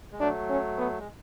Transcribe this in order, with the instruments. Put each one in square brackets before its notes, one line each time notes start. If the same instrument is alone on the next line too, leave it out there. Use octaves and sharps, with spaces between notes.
[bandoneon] G#3
[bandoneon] F#3 A3 [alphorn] D4
[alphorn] C#4
B3
[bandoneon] G#3